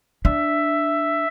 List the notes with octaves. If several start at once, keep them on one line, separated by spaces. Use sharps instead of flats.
D4 E5